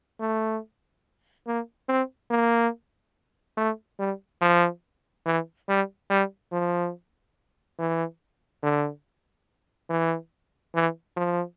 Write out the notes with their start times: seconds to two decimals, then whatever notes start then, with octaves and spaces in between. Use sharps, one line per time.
0.20 A3
1.47 A#3
1.89 C4
2.30 A#3
3.57 A3
3.99 G3
4.41 F3
5.26 E3
5.69 G3
6.10 G3
6.52 F3
7.79 E3
8.63 D3
9.90 E3
10.75 E3
11.16 F3